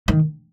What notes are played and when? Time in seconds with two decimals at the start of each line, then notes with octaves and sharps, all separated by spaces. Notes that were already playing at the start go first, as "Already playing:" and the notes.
0.08 D#3